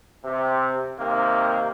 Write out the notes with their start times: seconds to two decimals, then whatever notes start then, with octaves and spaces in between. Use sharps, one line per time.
0.24 C3
0.98 C3 D#3 A#3